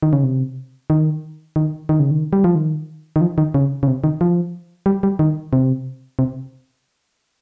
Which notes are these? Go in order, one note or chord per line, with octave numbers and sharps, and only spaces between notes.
D#3
C#3
C3
D#3
D#3
D#3
C#3
D#3
G3
F3
D#3
D#3
F3
D#3
C#3
C#3
C3
D#3
F3
G3
G3
D#3
C3
C3